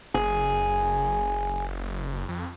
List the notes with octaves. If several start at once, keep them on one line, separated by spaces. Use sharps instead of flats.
F#1 G#4
F2